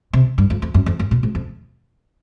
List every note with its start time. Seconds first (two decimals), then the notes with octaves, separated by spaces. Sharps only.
0.13 C3
0.38 G2
0.50 F2
0.62 F2
0.74 F#2
0.86 F2
0.99 F#2
1.11 A#2
1.23 G#2
1.35 F2